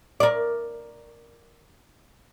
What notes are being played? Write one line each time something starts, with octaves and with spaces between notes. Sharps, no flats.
A#4 D5